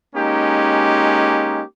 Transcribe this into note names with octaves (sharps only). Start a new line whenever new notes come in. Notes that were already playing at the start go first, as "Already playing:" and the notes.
G#3 A#3 C#4 D#4 G4